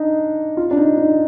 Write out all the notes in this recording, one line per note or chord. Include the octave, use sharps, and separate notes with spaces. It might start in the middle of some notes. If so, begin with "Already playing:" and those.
Already playing: D4 D#4
F4
D4
D#4
D#4